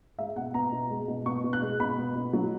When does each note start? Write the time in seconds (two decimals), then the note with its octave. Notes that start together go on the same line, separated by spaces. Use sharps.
0.18 G#3 E5
0.36 B2 F#5
0.54 B3 A#5
0.72 B2
0.90 G#3
1.08 B2
1.26 B3 C#6
1.44 B2
1.53 F#6
1.62 G#3
1.80 B2 B5
1.98 B3
2.16 B2
2.33 F#3